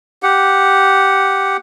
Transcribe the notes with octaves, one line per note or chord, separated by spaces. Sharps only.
G4 F#5